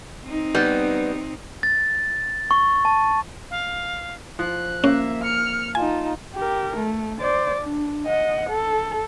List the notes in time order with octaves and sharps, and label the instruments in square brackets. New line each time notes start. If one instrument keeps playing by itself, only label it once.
[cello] C4 D#4
[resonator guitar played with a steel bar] G3 B3
[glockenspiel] A6
C#6
A5
[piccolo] F5
[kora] F3 [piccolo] F#6
[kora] A#3 [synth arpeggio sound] C#4 [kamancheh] E5
[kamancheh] F6 [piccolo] C#7
[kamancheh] D#4 F4 [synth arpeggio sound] G#5 [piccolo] A5
[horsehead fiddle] G4 A#4
A3
C5 D5
D4
D#5 F#5
A4